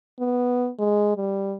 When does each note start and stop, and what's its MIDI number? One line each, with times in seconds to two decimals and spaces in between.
0.19 0.70 59
0.79 1.16 56
1.17 1.56 55